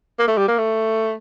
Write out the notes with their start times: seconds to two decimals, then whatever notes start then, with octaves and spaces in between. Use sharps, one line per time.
0.19 A#3
0.28 A3
0.38 G3
0.48 A#3
0.58 A3